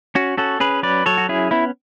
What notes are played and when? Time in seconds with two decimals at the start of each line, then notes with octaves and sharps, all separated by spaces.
0.15 C#4 F#4
0.37 C#4 F#4 A4
0.60 C#4 G#4 B4
0.83 F#3 B4 D5
1.06 F#3 A4 C#5
1.18 F#4
1.29 C#4 E4 G#4
1.51 B3 E4